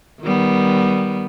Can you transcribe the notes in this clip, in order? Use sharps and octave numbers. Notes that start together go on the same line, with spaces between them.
D#3 G3 B3